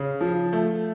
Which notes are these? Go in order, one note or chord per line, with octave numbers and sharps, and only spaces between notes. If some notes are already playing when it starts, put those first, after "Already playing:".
Already playing: C#3
F3
A3